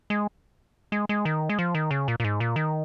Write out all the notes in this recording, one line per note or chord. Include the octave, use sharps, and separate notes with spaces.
G#3
G#3
G#3
D#3
G#3
F3
D#3
C#3
A#2
A#2
G#2
A#2
D#3